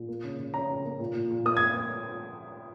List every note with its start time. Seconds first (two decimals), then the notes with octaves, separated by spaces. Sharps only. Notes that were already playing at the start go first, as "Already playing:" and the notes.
Already playing: A#2
0.08 A#3
0.24 C#3
0.39 C#3
0.54 C#4 A#5
0.69 C#3
0.85 A#3
1.00 A#2
1.15 A#2
1.31 A#2
1.45 A#3 D#6
1.57 G#6